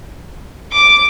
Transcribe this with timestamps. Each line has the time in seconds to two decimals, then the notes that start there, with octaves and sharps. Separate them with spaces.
0.72 D6